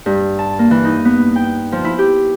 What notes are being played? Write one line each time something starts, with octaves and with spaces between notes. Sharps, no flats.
G2
A5
A#3
E3
D#4
B3
G5
F3
E4
G4